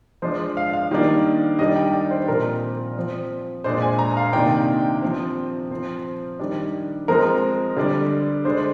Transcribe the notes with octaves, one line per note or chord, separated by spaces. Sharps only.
F3 G#3 D4 C5
F5
F5
D#3 G3 A#3 D4
D#3 G3 D4 D#5
G5
D5
C5
A#2 F3 C4 A#4
F3 C4
A#2 G#3 D4 C5
G#5
A#5
F5
C3 D#3 A#3 D4 G5
F3 C4
F3 C4 C5
D#3 G3 D4
F3 G#3 C4 A#4
D3 G3 D4
D3 G#3 D4 C5